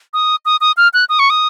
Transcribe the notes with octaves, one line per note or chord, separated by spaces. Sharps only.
D#6
D#6
D#6
F6
F#6
D#6
C#6
D#6